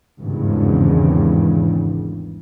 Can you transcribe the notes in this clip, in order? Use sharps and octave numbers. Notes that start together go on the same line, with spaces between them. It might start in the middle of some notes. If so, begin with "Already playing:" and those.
G#1 E2 G2 C#3